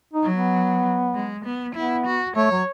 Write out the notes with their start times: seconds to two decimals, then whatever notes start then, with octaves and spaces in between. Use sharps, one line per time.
0.13 D#4
0.23 F#3
0.33 B3
1.15 G#3
1.45 B3
1.75 B3 E4
2.06 F#4
2.36 A3 C#5
2.51 F#3